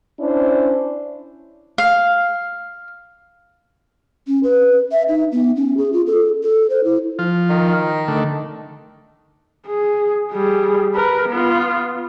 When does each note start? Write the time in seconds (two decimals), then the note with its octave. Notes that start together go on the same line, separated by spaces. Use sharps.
0.20 C#4 D4 E4 C5 D5
1.78 F5
4.27 C#4
4.43 B4
4.92 E5
5.09 D#4
5.32 B3
5.56 C#4
5.77 G#4
5.93 F4
6.07 A4
6.43 A4
6.70 C5
6.84 E4
7.19 F3 F4
7.50 D#3
8.08 D3 A3
9.68 G#4
10.32 G3 G#4
10.94 A#4 B4
11.29 B3 F4